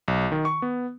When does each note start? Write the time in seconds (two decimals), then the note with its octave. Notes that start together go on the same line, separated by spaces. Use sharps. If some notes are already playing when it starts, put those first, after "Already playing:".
0.08 B1
0.32 D#3
0.45 C#6
0.62 B3